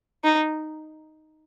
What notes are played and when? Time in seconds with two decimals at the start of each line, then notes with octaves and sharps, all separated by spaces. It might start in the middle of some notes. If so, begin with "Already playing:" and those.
0.24 D#4